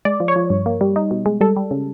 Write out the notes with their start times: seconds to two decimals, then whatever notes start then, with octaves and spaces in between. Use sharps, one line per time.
0.05 G#3 D5
0.20 F3
0.28 C#5
0.36 F3
0.50 G2
0.66 A#3
0.81 G3
0.96 D#4
1.11 B2
1.26 G#3
1.41 G3 A4
1.56 G3
1.71 C#3